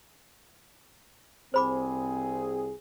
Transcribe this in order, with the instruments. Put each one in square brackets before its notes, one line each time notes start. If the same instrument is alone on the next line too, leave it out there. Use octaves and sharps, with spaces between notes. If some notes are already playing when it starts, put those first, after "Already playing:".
[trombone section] C2 C4 G#4 [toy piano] C5 B5 D6